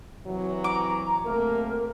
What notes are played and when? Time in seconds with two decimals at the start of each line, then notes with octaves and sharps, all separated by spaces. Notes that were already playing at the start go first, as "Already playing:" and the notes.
0.25 C3 E3 F#3
0.64 A#5 D6
1.24 C3 A3 A#3 A#4